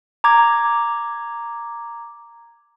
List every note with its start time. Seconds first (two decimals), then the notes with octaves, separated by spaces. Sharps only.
0.24 A#5 D6 G#6